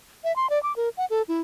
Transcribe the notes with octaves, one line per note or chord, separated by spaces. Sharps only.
E5
C6
D5
D6
A#4
F#5
A4
E4